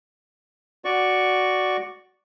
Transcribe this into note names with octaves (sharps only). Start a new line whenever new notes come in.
F#4 D5 C#6